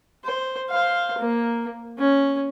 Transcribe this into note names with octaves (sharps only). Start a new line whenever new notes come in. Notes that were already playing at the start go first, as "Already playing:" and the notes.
C5
C5 F5
A#3
C#4